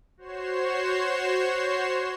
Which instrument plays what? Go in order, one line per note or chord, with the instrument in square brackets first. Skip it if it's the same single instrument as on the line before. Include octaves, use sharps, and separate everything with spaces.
[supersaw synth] F#4 C5 C#5 C7 E7